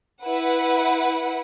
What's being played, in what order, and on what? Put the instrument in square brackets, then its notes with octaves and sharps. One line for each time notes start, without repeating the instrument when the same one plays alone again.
[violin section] E4 B4 F#5